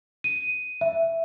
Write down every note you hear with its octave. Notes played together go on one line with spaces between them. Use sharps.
D#7
E5